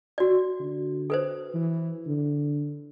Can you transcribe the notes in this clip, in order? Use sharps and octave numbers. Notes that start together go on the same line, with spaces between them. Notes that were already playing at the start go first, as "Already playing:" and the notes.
F#4 D5
D3
A4 B4 C5
E3
D3